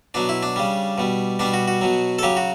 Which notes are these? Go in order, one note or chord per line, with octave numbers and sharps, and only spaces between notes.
B2 F#3 D4
E4
D4
C#3 G3
B2 G3
B2 G3 D4
F#4
F#4
B2 F#3
A4
C#3 F#3 G4
F#4